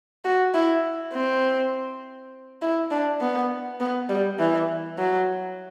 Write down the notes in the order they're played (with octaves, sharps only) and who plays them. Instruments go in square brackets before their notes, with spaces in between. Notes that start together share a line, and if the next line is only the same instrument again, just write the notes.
[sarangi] F#4
E4
C4
E4
D4
B3
B3
G3
E3
F#3